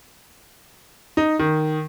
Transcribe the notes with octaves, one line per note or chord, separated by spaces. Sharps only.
D#4
D#3